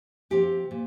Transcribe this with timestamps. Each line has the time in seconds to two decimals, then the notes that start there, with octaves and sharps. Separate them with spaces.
0.30 C3 F3 C4 G4
0.71 A#2